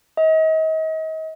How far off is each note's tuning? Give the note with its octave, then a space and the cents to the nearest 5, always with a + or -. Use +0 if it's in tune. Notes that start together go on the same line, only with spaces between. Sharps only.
D#5 +35